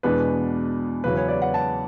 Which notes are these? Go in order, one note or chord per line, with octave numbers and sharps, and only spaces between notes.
E2 B2 G#3 B3 D4 B4
E2 C#3 F#3 C#4 B4
C#5
D5
F#5
A5